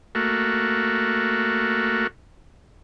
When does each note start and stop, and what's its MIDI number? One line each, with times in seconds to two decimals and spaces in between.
0.15 2.07 57
0.15 2.07 58
0.15 2.07 66